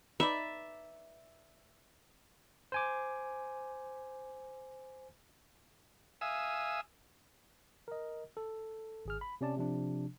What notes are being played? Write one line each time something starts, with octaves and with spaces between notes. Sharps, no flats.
D#4 B4 D5 E5
C5 G#5 D6
E5 F5 G#5 D#6 E6
A#4 D#5
A4
G#1 G#4 F6
B5
C3 C#4 D5 A5
C3 F3 D4